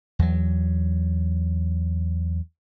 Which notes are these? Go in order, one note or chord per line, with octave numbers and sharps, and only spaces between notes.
E2 F#3